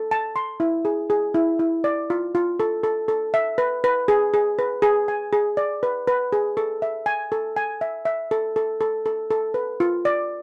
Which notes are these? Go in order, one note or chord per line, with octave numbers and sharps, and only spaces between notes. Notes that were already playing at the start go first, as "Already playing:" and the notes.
Already playing: A4
A5
C6
E4
G#4
G#4
E4
E4
D5
F4
F4
A4
A4
A4
E5
B4
B4
G#4
G#4
B4
G#4
G#5
G#4
D5
B4
B4
G#4
A4
E5
G#5
A4
G#5
E5
E5
A4
A4
A4
A4
A4
B4
F4
D5